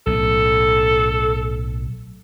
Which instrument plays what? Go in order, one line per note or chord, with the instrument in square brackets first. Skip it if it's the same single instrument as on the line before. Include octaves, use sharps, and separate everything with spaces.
[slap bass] B1 A2 [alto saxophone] A4